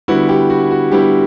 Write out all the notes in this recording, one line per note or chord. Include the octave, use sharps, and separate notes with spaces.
D3 G3 B3 E4 F#4
G4
F#4
F#4
D3 G3 B3 E4 G4